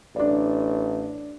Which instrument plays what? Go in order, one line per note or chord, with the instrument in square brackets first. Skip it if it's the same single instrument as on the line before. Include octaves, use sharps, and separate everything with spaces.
[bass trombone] A1 [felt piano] D4 D5